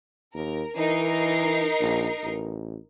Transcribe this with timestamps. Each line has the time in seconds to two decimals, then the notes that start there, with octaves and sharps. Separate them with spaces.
0.34 D#2 A#4
0.77 E3 D#4 A#4 C7
1.80 A#1
2.24 A1